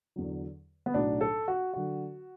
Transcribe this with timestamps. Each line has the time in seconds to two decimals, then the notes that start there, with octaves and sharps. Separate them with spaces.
0.16 E2 D3 F#3
0.86 B3
0.94 B1 A2 F#3 D4
1.21 A4
1.48 F#4
1.74 D3 F#3 F#4